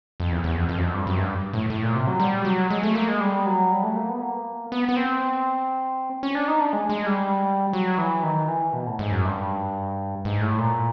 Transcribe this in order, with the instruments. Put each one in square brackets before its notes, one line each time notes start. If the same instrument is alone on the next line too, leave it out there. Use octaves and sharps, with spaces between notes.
[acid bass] F2
E2
E2
F2
F2
F#2
F2
G2
F#2
G2
A2
A2
A#2
C3
F#3
G3
F#3
G#3
A3
A#3
G#3
G3
F#3
G3
A3
A#3
B3
A#3
B3
B3
C4
C#4
D4
D#4
D4
G#3
G#3
G3
F#3
E3
D#3
E3
B2
A2
G#2
F#2
G2
G#2
A2
A#2